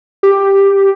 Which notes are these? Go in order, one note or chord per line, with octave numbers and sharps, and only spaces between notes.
G4